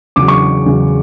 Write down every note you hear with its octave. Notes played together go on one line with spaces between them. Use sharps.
E2 C#3 F#3 D6
C#6
E2 C#3 F#3